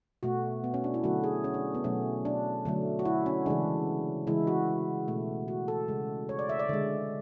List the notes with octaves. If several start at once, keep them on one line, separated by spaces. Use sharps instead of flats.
B2 A3 F#4
B3
C#4
D4
E4
D3 F#3 A3 F#4
G#4
C#4
D4
B3
B2 F#3 A3 C#4
D4
D3 F#3 A3
F#4
E4
C#4
C#3 E3 G#3 D4
C#3 E3 G#3 E4
F#4
B2 A3
F#4
A4
C#3 G#3
C#5
D5
E5
D5
D3 G#3